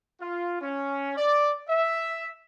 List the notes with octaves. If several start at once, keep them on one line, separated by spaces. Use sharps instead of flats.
F4
C#4
D5
E5